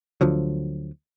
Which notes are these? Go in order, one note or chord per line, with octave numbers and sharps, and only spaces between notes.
D2 D3 F3 F#3